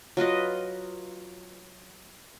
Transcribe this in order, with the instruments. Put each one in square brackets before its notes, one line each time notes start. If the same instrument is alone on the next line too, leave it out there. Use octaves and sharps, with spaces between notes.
[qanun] F#3 F4 B4 D#5